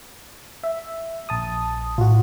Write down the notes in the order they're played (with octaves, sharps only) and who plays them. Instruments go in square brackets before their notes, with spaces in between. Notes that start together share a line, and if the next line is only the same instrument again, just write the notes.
[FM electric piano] E5
A#1 A5 D#6
[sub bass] A2 [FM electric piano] F4 F#4